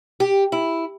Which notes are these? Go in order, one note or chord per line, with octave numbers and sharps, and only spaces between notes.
G4
E4